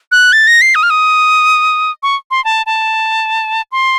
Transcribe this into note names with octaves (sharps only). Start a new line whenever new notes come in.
F#6
A6
A#6
C7
D#6
F6
D#6
C#6
C6
A5
A5
C6